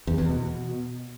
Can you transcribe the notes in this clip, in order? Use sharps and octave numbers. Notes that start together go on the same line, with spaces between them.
E2
E2
B2